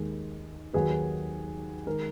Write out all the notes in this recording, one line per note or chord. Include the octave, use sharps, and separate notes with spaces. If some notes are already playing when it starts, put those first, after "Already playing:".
Already playing: D#2 D#3 G#3
D#2 D#3 F#3 G#4 B4
D#3 G#3 A#4